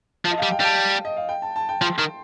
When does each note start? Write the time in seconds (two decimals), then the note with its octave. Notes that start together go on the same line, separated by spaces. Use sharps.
0.25 F3 A5
0.31 D#5
0.38 G3 F5
0.51 G5
0.60 G3 A5
1.05 D#5
1.17 F5
1.29 G5
1.42 A5
1.56 A5
1.69 G5
1.81 F3 C6
1.98 D#3